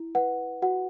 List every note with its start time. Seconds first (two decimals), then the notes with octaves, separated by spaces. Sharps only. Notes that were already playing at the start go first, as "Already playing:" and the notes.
Already playing: E4
0.15 B4 F#5
0.62 F#4 F#5